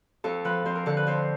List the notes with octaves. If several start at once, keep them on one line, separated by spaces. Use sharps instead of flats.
F2 A4
F3 B4
F2 C5
A#4
D3 A4
B4
F2 C5